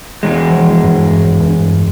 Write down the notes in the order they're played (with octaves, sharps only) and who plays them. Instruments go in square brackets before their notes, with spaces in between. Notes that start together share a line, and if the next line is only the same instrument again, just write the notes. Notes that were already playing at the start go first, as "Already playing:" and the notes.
[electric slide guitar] E2 G#3
[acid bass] F3
G2
G2